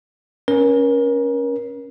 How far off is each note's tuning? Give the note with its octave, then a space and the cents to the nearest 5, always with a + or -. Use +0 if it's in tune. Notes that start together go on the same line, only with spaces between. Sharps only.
C#4 +0 A#4 +35